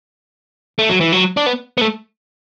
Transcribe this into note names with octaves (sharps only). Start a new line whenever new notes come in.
A3
F#3
E3
F#3
D4
B3
B3
A3